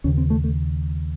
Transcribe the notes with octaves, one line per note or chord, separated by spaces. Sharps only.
D#2 C#3 C#4
C4
A3
A3